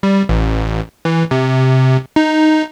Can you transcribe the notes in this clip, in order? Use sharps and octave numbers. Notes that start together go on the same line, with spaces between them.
G3
A1
E3
C3
D#4